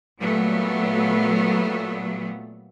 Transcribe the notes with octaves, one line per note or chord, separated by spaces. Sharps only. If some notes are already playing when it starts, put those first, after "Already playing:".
A#2 F#3 G3 A3 B3